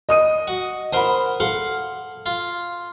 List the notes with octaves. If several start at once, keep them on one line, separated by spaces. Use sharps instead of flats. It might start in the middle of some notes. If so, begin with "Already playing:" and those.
D#5 D#6 D#7
F#4
A#4 C5 F#5 B5 D#6
A4 F5 F#5 C6
F4